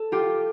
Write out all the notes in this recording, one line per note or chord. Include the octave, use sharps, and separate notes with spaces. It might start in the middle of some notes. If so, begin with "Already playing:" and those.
Already playing: A4
F4 G4